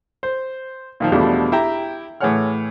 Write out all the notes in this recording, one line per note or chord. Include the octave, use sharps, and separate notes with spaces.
C5
A#2 D#3 F3
E2 B2 F3 G3 A3 D4
E4 G4 G5 A#5
A2 E3 G#4 C#5 F#5 F6